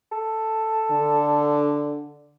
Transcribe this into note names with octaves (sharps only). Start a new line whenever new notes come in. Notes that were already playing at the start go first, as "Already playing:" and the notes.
A4
D3